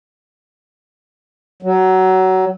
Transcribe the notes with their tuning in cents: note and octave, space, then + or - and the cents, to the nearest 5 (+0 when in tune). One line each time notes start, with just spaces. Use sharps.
F#3 +20